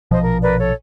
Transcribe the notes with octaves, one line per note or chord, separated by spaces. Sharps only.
A#1 B2 F3 C5 D#5
A#4
A#4 B4 D5
A4 C#5